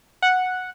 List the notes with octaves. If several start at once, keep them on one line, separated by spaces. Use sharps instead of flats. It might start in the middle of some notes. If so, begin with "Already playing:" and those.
F#5